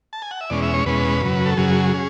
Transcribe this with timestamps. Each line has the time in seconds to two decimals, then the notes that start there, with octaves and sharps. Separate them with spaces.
0.13 A5
0.22 G#5
0.31 F#5
0.41 E5
0.50 E2 B2 G#3 C#4 D5
0.62 E5
0.74 C#5
0.86 E2 B2 G#3 C#4 B4
1.22 F#2 C#3 F#3
1.46 A4
1.57 F#2 C#3 F#3 G#4
1.94 C#4